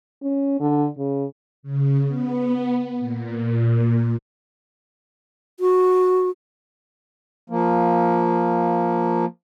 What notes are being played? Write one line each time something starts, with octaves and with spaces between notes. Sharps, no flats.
C#4
D3
C#3
C#3
B3
A#2
F#4
F3 A#3